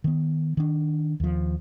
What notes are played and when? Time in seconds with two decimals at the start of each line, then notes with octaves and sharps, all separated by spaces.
0.04 D#3 B3
0.57 D#3 D4
1.20 D#2 F3